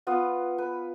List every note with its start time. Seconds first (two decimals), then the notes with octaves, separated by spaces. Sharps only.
0.07 B3 F4 F#5
0.58 B4